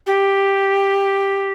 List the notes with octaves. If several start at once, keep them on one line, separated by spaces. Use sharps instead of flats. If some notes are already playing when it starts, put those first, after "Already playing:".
G4